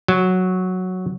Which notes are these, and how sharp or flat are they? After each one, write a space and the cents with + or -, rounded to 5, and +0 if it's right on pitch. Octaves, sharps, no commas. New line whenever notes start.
F#3 -5